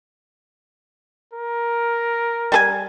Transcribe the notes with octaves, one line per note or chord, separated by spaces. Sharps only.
A#4
G3 A4 G#5